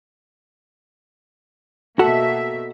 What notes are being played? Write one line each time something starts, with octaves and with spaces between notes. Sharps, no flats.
B2 A#3 F#4 A4 E5 F#5